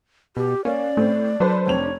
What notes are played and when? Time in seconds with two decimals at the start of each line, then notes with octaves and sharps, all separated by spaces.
0.37 B2 G4
0.65 A#3 C#4 D5
0.97 A2 A3 C4
1.40 F#3 D4 A4 B4 C5
1.67 F1 C4 C#5 F7